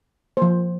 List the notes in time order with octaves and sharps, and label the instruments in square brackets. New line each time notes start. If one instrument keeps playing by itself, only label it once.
[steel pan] F3 A#3 C5